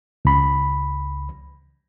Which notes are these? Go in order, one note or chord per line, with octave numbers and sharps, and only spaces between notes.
C#2 B5